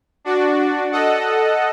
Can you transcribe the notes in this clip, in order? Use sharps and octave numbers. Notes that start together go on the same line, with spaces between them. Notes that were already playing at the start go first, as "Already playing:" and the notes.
D4 F#4 D5
A4 D#5 F#5